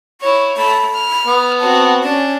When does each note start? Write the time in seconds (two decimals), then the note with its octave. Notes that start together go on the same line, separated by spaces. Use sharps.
0.21 E4 C#5 C#6
0.57 A3 B5
0.94 F6
1.27 B3
1.60 C4 F#4 A5
2.03 C#4 D4